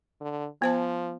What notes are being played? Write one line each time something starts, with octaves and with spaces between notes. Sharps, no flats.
D3
F3 B3 C5 A5